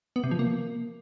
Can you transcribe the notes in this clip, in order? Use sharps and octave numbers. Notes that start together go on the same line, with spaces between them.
B3
C3
F3
A#3